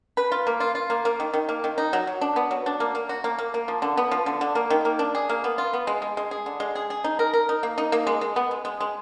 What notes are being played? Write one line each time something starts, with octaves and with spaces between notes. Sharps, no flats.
B4
F4
A#3
F4
F4
A#3
A#3
D#3
D#3
A#3
D#3
D#4
F#3
F#3
D4
B3
F#3
D4
A#3
A#3
F#4
A#3
A#3
A#3
F3
D3
B3
F3
D3
D3
A#3
D#3
A#3
D4
G#4
A#3
B3
F4
B3
G#3
G#3
G#3
G#4
D3
G#3
G#4
G#4
D#4
A#4
A#4
D#4
A#3
D#4
A#3
G#3
G#3
B3
G#3
G#3
G#3